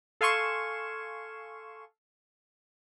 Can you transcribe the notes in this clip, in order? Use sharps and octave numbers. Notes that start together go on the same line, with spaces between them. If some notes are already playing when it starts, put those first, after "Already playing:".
A4 F5 G#5 C6 C#6 E7